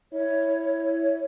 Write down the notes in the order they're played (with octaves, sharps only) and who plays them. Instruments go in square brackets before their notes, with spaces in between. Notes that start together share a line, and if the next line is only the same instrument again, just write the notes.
[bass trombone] E4 [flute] C#5